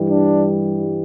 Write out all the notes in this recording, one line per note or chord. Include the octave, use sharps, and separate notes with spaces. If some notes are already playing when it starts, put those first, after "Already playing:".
Already playing: G2 E3 G3
D4